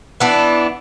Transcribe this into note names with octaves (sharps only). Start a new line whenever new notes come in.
E3 B3 D4